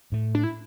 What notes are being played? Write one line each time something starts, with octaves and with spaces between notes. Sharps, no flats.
A2 A3
D4
E4